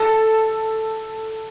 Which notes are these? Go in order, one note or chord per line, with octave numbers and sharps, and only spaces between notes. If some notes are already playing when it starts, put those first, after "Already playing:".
Already playing: A4